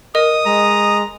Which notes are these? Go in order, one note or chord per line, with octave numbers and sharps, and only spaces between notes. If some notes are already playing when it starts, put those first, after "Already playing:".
A#4 D#5 D#6
G#3 A#5